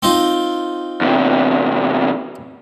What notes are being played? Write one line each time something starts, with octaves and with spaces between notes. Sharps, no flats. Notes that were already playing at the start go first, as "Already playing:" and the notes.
C4 D#4 F4
E2 C3